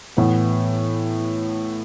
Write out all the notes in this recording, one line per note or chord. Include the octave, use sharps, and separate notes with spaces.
A2 E3 B3